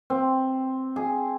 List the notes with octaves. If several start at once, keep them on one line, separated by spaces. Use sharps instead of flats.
C4
G#4